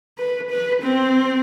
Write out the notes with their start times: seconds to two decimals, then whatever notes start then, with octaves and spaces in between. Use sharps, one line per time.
0.18 B4
0.50 B4
0.82 C4